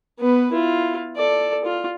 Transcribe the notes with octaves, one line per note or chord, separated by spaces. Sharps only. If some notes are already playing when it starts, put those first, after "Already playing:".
B3 B4
E4 F4
A4 D5
F4